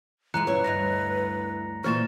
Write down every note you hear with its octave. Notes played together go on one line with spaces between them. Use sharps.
E2 E3 G#3 B4 A#5 F#6 C#7
F#2 A#2 E4 B4 C#5
D2 G2 D#5 A#6 F7
A#2 E3 C5 C#6 F6 A6 E7